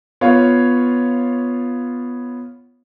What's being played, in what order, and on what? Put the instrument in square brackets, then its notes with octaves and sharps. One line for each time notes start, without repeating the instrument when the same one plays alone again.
[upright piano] B3 F4 C#5 F5